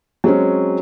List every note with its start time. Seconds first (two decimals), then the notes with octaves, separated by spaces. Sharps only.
0.24 F#3 G#3 C4 C#4